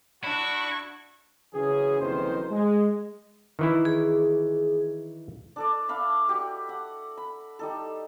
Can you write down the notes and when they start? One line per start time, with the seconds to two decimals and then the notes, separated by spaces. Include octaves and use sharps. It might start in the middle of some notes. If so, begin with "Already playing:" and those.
0.24 D4 E4 F#4 C#6
1.54 C#3 E3 F#3 C#4 G#4
2.01 F#1 F2 C3 D#3 E3 C5
2.51 G#3
3.59 D#3 E3 E4
3.85 G#4
5.56 D4 A4 D5
5.89 D4 E5 F5 B5
6.29 F#4 G4
6.69 F#5
7.17 B5
7.59 G3 D#4 A4